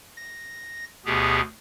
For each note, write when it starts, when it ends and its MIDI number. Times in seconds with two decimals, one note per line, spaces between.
0.17 0.85 94
1.06 1.41 38
1.06 1.41 47
1.06 1.41 59
1.06 1.41 67
1.06 1.41 68